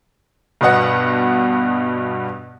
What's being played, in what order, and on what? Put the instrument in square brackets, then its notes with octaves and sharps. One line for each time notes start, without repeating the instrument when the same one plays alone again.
[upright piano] G2 B2 B3 D#5 F#5